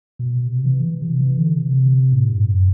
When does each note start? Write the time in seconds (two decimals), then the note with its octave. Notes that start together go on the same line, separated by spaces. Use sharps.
0.19 B2
0.47 C3
0.65 E3
0.83 E3
1.02 C3
1.20 E3
1.39 D3
1.57 C3
2.12 A2
2.30 G2
2.48 F#2